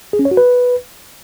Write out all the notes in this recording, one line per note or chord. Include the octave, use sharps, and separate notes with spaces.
G#4
C#4
C#5
F#4
B4